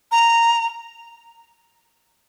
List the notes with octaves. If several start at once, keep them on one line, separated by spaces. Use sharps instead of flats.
A#5